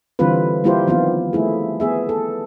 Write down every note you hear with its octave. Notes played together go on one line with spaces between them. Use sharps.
D3 E3 G3 C4 F4 B4
G3 A#3 E4 F4 G4 C5
D#3 F3 B3 C4 F4
A3 E4 G#4
B3 G#4 E5
A4